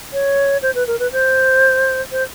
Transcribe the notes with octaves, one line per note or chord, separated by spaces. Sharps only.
C#5
C5
B4
A#4
B4
C5
C5